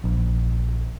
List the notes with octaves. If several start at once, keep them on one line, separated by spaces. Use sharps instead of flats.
A#1